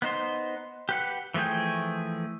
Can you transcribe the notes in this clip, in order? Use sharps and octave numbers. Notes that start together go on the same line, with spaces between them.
B3 D#4 C5 C6
G4 B4 F#5
E3 F3 A3 G#4 G5